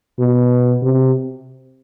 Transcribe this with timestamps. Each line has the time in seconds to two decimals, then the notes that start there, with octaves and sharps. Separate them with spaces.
0.19 B2
0.83 C3